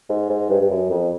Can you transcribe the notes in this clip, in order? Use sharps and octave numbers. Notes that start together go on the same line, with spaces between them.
G#2
G#2
G2
G2
F#2
F2